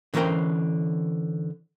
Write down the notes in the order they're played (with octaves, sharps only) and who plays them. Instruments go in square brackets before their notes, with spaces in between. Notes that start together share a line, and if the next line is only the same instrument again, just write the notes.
[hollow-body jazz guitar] D3 E3 C#4 A#4 C5 G5